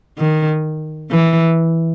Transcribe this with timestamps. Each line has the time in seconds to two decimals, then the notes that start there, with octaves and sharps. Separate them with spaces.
0.18 D#3
1.11 E3